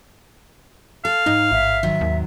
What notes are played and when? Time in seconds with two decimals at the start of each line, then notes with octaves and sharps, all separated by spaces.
1.05 A4 F5
1.26 G#2 D#4
1.52 A1 E5
1.83 G#2 D#3 F#3
2.01 D#2